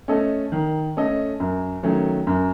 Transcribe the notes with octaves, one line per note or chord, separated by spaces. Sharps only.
A3 C#4 A4 D#5
D#3
A3 C#4 A4 D#5
F#2
D#3 F#3 A3 C#4
F#2